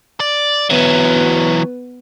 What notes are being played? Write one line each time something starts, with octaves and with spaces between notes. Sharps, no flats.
D5
E3 F#3 B3